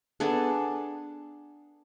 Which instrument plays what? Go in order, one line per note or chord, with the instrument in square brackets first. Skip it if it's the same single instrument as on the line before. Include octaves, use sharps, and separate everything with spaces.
[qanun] B3 D4 G#4 A4